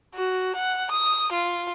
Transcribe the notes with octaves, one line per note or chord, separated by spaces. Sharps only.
F#4
F#5
D#6
F4